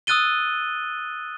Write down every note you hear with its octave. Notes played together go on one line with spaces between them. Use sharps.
D#6 E6 F#6 A6 D#7 G7